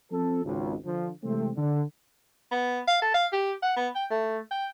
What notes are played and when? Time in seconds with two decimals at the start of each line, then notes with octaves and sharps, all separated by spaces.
0.12 F3 C4 A4
0.44 G#1 C#2
0.85 D3 F3
1.24 C3 E3 G#3 A3 C4
1.56 D3
2.51 B3
2.87 F5
3.02 A4
3.14 F5
3.33 G4
3.62 F#5
3.77 B3
3.95 G5
4.11 A3
4.51 G5